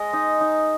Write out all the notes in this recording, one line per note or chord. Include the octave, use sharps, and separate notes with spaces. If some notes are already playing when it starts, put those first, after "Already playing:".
Already playing: G#3 D#5
D#4
D#4